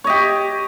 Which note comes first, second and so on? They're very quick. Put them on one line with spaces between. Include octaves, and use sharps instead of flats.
C#5 D#5 G4